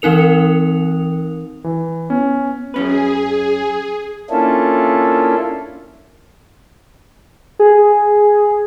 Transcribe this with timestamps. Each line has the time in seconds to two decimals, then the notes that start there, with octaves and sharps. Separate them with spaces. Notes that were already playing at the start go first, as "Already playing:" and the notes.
0.02 E3 C4 D#4 A#4 F7
1.64 E3
2.10 B3 C#4
2.74 F#2 C#4 G#4 B4
4.30 A#3 C#4 D4 E4 F4 A4
7.59 G#4